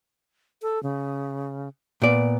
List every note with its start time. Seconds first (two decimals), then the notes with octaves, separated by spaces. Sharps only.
0.62 A4
0.83 C#3
2.02 A#2 B3 D5